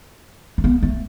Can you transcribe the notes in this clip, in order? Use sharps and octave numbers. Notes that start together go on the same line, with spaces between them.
A3
B3
A3